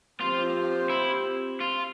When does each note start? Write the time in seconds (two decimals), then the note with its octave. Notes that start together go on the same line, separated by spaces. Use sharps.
0.20 F3 C4 F4 G4 C5
0.90 E4
1.60 F4